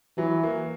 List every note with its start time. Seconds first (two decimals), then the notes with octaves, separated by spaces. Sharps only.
0.18 E3 F#3
0.43 A#3